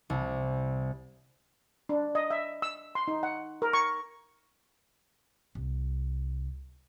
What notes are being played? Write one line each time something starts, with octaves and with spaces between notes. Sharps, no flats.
C2
D4
D#5
E5
E6
C6
D#4
F#5
A#4
C#6
C2